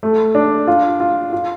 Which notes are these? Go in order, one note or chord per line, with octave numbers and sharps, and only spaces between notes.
A3
D4
F4
F4
F4